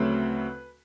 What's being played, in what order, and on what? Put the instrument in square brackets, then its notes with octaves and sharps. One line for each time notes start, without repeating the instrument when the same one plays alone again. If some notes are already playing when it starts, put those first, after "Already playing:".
Already playing: [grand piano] D2 C#3 F#3 A3 C4 B4